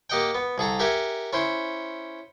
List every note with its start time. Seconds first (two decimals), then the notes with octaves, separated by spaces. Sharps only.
0.10 A#3 G4 D#5 F#5 G5
0.35 B3
0.58 C2 G#4 A4 A#5
0.79 G4 A#4 E5 F#5 G#5
1.33 C#4 E4 C5